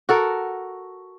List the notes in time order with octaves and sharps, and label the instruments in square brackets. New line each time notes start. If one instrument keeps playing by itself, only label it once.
[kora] F#4 A4 A#4